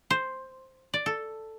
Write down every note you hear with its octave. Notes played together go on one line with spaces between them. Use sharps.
C5
D5
A4